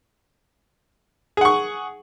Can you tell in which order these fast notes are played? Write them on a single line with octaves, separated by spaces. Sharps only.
G#4 F#5 C#6